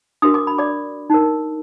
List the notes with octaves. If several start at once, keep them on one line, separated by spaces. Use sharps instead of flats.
D4 F#4 A#4 D#6
D6
B5
D5 D6
D#4 A#4